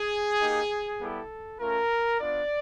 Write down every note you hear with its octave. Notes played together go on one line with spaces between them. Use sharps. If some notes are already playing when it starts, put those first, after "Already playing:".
Already playing: G#4
A#3 D#4 G4
G3 B3 E4 G4 A4
A3 C#4 F4 A#4
B3 D4 F4 D5